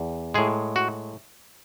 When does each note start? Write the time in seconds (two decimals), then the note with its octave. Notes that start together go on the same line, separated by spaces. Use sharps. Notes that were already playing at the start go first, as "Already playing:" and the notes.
Already playing: E2
0.34 A2 G#3 G#4
0.76 F#4